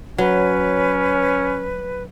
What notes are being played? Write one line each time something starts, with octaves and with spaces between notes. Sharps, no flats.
F#3 C#4 B4